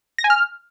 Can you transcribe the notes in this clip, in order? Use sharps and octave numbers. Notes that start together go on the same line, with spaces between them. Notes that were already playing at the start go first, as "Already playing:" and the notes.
A#6
G#5
F6